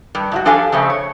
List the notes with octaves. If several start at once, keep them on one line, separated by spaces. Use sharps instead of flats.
G2
G#2 E4 F#4
F3 D4 G4 A4 F5 G#5
F2 C#3 A3 C4
C#5